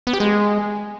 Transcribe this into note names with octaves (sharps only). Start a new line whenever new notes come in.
B3
G4
G#3